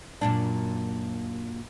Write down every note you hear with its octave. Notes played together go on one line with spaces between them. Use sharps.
F#2 A#2 D4